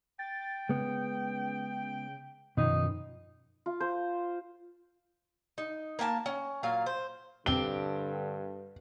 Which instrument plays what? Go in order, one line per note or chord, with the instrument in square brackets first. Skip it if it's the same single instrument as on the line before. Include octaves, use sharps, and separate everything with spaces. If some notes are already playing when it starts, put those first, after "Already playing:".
[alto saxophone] G5 [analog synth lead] A6
[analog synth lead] C#3 [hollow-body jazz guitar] G#3 B3
[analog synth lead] F#2 [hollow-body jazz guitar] B2 D#3 F3 [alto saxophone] D#4
[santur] F4
C5
[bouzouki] D#4
A#3 A#4 G#5 A5
C#4
A#2 F#3 F5
C5
[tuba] G2 [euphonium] D3 [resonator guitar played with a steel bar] C4 G4 [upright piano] G7